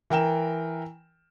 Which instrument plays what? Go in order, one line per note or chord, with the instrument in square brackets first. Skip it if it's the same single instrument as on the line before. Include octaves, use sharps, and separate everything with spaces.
[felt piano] E3 A#4 G5 E7